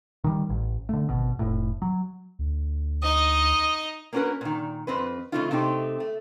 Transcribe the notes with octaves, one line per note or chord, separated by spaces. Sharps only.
D#3 G3
A1
D3 A3
G#1 B2
F1 A2
F#3
D2
D#4 D#5 D#6
A#3 B3 C#4 F#4 A#4 B4
A#2 D#3
F2 C4 B4
C#3 E3 A3 C4 D#4 F4
C3 A3 C4 D#4 G4
A3